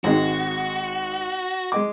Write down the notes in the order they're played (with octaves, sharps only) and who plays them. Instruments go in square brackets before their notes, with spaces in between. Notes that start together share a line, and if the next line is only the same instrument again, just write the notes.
[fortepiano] G#1 G#3 D#4 [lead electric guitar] F#4
[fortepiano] G#3 D#5 D6